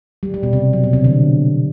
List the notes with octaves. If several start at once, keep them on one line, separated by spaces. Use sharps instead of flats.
G3
G3
B2
C3
F#3
B2
C3
D3